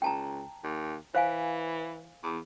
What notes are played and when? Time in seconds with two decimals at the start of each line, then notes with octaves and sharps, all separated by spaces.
0.02 C#2 G5 A5 A#5
0.64 D#2
1.15 E3 C5 F5 G#5
2.23 E2